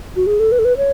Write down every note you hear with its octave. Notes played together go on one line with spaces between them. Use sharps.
F#4
G#4
A4
B4
A4
B4
C#5